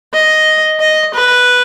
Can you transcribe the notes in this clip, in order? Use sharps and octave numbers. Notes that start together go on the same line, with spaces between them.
D#5
D#5
B4